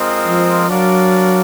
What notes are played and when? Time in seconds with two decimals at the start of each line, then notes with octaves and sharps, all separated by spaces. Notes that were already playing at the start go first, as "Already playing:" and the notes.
Already playing: G#3 C4 F4 A#4 D#5
0.27 F3
0.69 F#3 D4 F#4 A#4 D5 F5